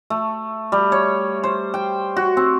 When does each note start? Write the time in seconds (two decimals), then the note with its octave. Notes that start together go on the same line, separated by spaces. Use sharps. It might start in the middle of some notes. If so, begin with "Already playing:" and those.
0.10 A3
0.72 G3
0.92 C#5
1.44 C5
1.74 G5
2.17 F#4
2.37 C4